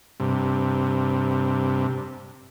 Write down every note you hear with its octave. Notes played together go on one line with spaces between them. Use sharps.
G2 C3